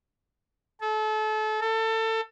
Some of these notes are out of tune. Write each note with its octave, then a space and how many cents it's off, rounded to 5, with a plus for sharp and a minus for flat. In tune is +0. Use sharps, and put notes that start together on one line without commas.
A4 -30
A4 +25